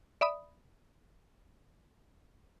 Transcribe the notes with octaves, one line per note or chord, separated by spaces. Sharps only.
D5 E5 B5 D#6